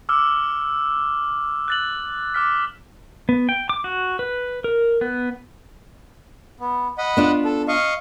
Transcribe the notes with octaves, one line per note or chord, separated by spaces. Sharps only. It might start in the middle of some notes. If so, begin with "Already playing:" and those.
D6 E6 F6
F#6 A6 F#7
D6 F6 B6
B3
G5
D6
F#4
B4
A#4
B3
B3
D#5 F#5 B5
B3 D4 F4
A4
D#5 F5 C#6